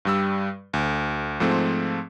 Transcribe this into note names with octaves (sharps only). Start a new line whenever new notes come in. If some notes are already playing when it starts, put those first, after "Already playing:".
G2 G3 E6
D2
G#2 F3 A3 C4